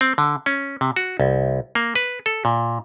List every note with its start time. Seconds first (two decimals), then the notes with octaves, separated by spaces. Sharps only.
0.01 C4
0.18 D3
0.46 C#4
0.81 C3
0.96 F#4
1.20 C2
1.75 A#3
1.95 B4
2.26 A4
2.45 A#2